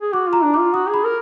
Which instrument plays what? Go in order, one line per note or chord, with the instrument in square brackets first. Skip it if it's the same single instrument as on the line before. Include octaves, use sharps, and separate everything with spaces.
[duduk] G#4
[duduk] F#4 [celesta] D6
[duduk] F4
[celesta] A#5
[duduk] D4
[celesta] D6
[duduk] F4
[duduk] F#4 [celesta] D#6
[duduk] G#4 [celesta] B5
[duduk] A#4